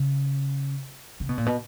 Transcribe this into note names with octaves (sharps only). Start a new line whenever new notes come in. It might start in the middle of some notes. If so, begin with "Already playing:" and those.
Already playing: C#3
C#3
B2
A#2
B2